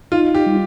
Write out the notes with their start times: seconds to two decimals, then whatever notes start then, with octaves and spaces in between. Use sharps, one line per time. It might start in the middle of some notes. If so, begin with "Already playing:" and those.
0.12 D#4 F4
0.35 G4
0.46 G3